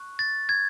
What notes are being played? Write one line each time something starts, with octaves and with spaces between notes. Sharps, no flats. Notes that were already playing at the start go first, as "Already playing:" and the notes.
Already playing: C#6 F#6
A6
G#6